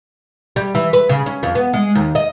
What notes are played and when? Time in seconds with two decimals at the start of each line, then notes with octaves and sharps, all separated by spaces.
0.56 G3
0.75 E3
0.93 B4
1.09 C#3
1.26 C#4
1.43 F2
1.55 B3
1.73 G#3
1.95 D#2
2.15 D#5